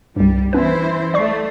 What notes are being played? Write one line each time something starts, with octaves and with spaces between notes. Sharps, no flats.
C2 G2 G3
E3 B3 C#4 E4 B4 C5
A3 D5 C#6 C7